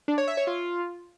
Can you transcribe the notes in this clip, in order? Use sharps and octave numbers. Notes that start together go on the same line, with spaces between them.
D4
C#5
E5
C#5
F4